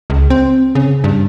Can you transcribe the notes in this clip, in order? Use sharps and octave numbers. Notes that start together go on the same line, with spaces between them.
C#2
C4
C#3
G2